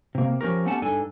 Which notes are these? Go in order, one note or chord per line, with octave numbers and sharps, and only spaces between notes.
C3 A#3
F3 C#4 G4 A#4
A3 B3 C#4 G4 F#5 A5
G2 D4 D#4 A4 G#5